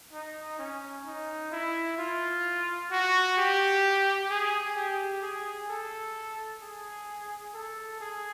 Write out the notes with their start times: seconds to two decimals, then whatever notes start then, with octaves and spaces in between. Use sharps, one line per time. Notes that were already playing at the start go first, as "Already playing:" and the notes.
0.13 D#4
0.59 C#4
1.05 D#4
1.52 E4
1.98 F4
2.91 F#4
3.37 G4
4.30 G#4
4.76 G4
5.22 G#4
5.69 A4
6.61 G#4
7.54 A4
8.00 G#4